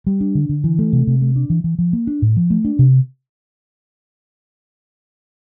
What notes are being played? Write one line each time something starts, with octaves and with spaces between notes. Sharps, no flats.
G3
D4
D3
D3
E3
A3
C3
C3
A3
D4
E3
E3
F3
A#3
D4
A2
F3
A3
D4
C3